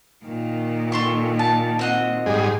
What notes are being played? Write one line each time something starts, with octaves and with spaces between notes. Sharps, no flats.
A#2 D#3
A4 C6 C#6
A5
C4 F#4 D#5
G#2 G3 G#4